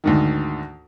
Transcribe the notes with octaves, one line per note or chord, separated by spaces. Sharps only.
D2 G#2 D#3